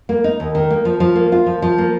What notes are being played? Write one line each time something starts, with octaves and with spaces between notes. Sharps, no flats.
A#3
D#4
D#2
D#3
A#3
F3
F3
A#3
F4
F3
F3
A#3